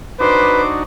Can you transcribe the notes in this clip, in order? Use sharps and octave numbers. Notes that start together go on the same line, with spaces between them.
D4 D#4 F#4 B4 C5 D6